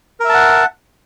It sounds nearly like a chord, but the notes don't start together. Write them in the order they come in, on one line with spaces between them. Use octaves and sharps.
A#4 E5 A5 F#5